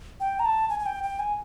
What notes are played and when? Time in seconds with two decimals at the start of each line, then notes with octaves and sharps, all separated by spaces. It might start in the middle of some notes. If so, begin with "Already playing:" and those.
0.20 G5
0.39 A#5
0.45 A5
0.69 G#5
0.79 G#5
0.86 G5
1.03 G5
1.19 G#5